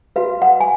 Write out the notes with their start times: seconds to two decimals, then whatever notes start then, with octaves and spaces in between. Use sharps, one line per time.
0.16 F#4 B4 F5
0.42 F#5
0.60 G#5